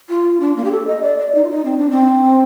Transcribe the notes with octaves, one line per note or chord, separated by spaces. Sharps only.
F4
D4
A#3
G4
A4
D#5
D5
D5
D#4
F4
D#4
C4
D4
C4